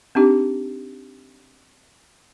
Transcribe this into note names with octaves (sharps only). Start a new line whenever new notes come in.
C4 D4 D#4 G4 D6